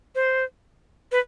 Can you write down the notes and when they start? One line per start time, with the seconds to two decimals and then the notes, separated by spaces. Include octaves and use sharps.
0.15 C5
1.12 B4